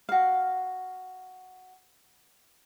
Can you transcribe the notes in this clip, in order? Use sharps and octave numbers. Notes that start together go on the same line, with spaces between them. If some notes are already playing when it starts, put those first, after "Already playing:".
F#4 F5